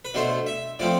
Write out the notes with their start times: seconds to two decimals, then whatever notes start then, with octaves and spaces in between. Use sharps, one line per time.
0.05 B4
0.14 B2 A3 D4 C5
0.46 E5
0.79 A2 F3 A3 C4 D5